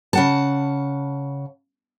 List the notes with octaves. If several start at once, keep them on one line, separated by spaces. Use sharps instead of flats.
C#3 F#5 A5